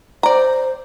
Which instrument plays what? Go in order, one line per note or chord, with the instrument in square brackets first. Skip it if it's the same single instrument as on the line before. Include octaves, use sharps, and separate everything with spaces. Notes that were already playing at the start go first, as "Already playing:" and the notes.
[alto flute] C5 [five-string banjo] D5 A#5